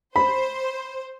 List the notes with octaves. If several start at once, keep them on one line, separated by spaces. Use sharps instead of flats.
C5 B5